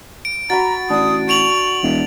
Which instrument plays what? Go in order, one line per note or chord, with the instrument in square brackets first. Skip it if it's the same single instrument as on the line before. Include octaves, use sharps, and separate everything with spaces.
[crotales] D7
[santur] F#4 B5 [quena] A#5 [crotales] A6
[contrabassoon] A1 [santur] D4 [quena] D#6
[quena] C#6 [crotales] D7 F7 F#7
[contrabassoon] E1